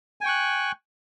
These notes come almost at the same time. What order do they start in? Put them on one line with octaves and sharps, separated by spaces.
G#5 G5 C#6 F#6